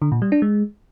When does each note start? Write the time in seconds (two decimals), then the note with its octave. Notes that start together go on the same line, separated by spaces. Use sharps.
0.02 D3
0.12 A#2
0.22 G3
0.32 D4
0.42 G#3